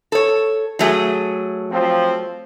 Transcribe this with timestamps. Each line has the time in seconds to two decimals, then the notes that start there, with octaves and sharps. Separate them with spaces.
0.12 A4 C#5
0.79 F#3 A3 G#4
1.71 F3 C4